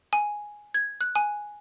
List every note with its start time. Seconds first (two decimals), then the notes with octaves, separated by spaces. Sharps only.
0.13 G#5
0.74 G#6
1.01 F#6
1.15 G#5